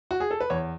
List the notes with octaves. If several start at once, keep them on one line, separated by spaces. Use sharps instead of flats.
F#4
G#4
A4
B4
E2 C#5